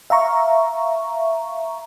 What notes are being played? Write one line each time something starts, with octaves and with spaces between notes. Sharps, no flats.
E5 F5 A#5 C#6